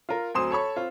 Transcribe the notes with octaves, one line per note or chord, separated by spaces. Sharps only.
F4 A#4
D2 F#3 C4 C6 D#6 E7
A4 C#5 B5 C#6
C4 F4